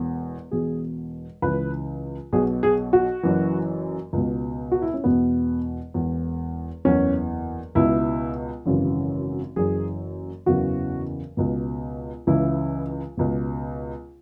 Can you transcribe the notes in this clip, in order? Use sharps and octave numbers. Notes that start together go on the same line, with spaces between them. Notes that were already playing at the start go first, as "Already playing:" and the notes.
Already playing: E1 E2 B2
E1 E2 B2 G#4
C#2 C#3 E3 B4
B1 B2 G#4
G#4
F#4
F#1 F#2 E3
C#2 B2
F#4
E4
C#4
E1 E2 B2 B3
E1 E2 E3
F#1 E2 E3 C#4
C#2 B2 E4
G#1 F#2 C#3 E3
F#1 F#2 E3 G#4
F#1 E2 C#3 E3 F#4
C#2 B2
C#2 C#3 E3 E4
C#2 B2